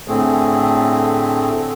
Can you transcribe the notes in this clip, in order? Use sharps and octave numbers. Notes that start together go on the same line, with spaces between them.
A2 D3 A3 C4 G#4